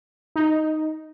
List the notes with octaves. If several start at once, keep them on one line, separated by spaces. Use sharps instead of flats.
D#4